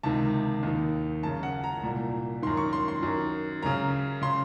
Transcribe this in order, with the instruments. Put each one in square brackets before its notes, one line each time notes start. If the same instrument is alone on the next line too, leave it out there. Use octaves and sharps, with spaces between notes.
[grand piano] C#2 C3 D#3 A5
D#2 D#3
F#2 C#3 A5
F#5
A#5
C2 A#2
F#2 D#3 C6
C#6
C6
C6
F#2 D#3
F#2 C#3 A#5
C#3 C6